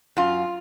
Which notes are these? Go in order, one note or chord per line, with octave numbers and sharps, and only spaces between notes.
F#2 F4